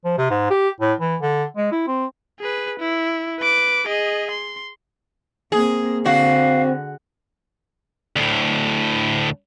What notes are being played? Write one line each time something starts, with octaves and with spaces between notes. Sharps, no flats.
F3
C3
G#2
G4
A2
E3
D3
G#3
E4
C4
G#4 B4
E4
B4 D6
G#4 D#5
C6
A#3 C4 G#4
D3 C4 F#4 F5
D2 A2